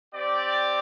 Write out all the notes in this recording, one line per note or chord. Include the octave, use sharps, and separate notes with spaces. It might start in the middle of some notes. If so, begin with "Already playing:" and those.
C4 G4 D5